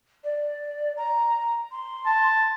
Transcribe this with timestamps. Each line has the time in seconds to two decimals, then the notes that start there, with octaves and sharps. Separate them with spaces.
0.24 D5
0.97 A#5
1.71 C6
2.06 A5